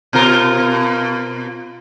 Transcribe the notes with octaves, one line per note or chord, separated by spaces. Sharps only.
B2 F4 A#4